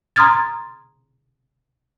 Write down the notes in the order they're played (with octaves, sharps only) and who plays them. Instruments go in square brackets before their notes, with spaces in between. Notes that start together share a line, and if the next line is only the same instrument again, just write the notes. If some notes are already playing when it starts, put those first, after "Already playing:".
[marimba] A#5 C6 D#6 F6 G#6 A6